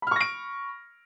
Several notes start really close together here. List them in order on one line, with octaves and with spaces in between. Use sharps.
B5 F6 C#6 A#6 D7